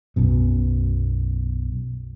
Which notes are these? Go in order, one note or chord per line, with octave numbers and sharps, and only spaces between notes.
B1 F#2 B2